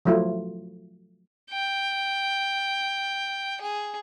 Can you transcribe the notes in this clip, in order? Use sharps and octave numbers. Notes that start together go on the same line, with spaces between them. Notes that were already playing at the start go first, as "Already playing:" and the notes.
F3 F#3 A3 E4 F4
G5
G#4